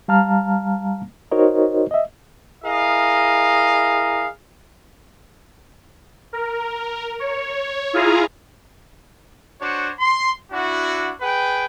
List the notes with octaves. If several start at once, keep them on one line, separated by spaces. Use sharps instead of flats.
G3 F5 A5 A#5 F6
D#4 F#4 A#4 C5 C#5 D#5
D#5 E5
E4 G#4 A#4 D#5 F5
A#4
C#5
E4 F4 G#4 F5 G#5 A#5
D4 F#4 C5 C#5
C6
D4 E4 F#4
G#4 B4 G5